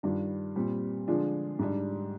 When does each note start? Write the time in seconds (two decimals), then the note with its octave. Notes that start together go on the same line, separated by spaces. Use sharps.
0.03 G2 D#3 G3 D4 F4
0.56 A#2 G3 C4
1.08 D3 F3 G#3 D4 F4
1.59 G#2 G3 D4